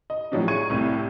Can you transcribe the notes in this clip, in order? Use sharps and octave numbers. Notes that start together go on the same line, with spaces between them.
D#5
A2 F3 F#3 D4 D#4
G#4 C#6 G#6 D#7
C2 A2 C3